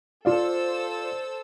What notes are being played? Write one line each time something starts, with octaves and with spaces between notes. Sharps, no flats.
F4 A4 C5 D5 F5 E6